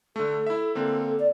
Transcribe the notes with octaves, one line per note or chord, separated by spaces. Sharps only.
D3 A3 A4
E4 E5
D3 A#3 C4 A4
D5